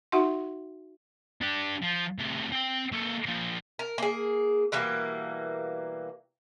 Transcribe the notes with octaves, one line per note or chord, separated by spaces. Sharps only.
D#4 F#4 E5 F#5 C6
D4 G4
F3
A2 C3
C4 G5
A#3 A4
A#2 F3
A#4
A#3 G#4
B2 E3 G3 A#3